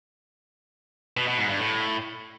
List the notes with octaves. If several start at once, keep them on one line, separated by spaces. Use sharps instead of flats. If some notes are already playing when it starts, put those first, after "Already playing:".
B2
B2
G#2
G2
A2